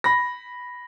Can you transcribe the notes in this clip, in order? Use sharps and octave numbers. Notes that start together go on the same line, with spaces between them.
B5 A#6